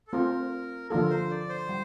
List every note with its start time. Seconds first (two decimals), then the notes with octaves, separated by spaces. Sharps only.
0.07 A4
0.12 A3 C4 F4 A#4 C5
0.90 D3 F3 A#3 F4 A4 A#4
1.10 C5
1.31 D5
1.49 C5
1.69 G3